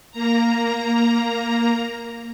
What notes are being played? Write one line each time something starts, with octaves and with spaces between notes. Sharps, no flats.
A#3 A#5